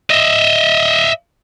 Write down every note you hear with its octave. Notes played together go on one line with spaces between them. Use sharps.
D#5 E5